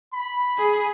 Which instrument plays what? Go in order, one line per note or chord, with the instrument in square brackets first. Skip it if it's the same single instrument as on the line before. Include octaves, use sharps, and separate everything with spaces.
[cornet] B5
[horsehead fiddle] G#4